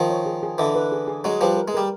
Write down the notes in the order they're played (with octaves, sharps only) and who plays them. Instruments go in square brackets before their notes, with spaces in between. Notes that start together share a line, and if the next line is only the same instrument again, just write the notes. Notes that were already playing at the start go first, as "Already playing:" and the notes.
Already playing: [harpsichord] D#3 F3
[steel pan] C#5
G#4
G#4
[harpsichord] D3 E3 [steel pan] D#5
[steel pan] B4
G#4
G#4
[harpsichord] F#3 G#3 [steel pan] D#5
[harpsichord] F3 G3 [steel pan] B4
[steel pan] A#4
[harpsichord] G#3
[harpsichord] G3 [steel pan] A#4